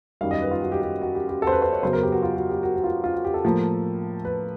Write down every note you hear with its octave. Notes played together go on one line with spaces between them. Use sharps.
F#2 D#3 G3 F5
D#5
B4
F4
F#4
G4
G4
F#4
G4
G4
A4
C5
B4
C5
C#5
F#2 C#3 F#3 B3 C5
A#4
G4
F#4
F4
F#4
G4
F#4
F#4
F4
F4
F#4
G4
A4
A2 F3 A#3
B4